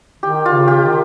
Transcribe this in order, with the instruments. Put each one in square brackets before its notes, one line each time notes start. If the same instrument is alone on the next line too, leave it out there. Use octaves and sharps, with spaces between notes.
[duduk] D#3 [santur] G4
[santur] F4
[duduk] C#3
[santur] G4
[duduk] D#3